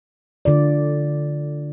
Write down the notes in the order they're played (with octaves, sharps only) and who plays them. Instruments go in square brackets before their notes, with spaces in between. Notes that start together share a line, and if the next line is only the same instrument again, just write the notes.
[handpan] D3 F4 D5